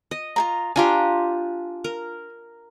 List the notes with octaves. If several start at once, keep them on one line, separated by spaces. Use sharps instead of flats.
D#5
F4 G#4 A#5
D4 F4 G4 G#5 A#5 C6
A#4